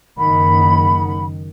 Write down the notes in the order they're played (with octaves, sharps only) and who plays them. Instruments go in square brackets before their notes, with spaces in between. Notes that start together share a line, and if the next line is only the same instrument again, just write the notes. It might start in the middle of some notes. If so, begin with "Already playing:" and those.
[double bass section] F#1 D#3 [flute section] F#5 B5